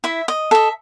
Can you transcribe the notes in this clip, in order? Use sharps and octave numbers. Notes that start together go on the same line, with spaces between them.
E4 E5
D#5
A4 D#5 E5